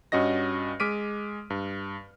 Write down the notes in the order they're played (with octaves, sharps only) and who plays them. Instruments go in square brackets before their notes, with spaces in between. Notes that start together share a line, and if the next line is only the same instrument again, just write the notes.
[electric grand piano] G2 C#4 F#4 D#5 A#6
G#3 D6 F6 B6 D7 D#7
G2